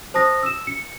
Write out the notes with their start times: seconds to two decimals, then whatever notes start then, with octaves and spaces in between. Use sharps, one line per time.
0.14 C5 A5 D#6 A#6
0.43 E6 E7
0.67 C#7